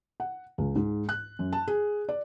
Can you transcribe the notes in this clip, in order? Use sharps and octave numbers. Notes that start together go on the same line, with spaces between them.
F#5
C#2
G#2
F#6
F#2
A5
G#4
D5